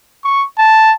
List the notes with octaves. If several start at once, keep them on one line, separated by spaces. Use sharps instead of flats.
C#6
A5